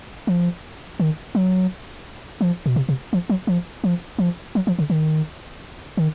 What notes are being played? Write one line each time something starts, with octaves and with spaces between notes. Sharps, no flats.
F3
D#3
F#3
F3
B2
C3
C3
F3
F#3
F3
F3
F3
F#3
F3
D3
D#3
D#3